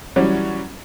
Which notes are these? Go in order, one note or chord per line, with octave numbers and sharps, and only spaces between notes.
E3 F#3 G3 C#4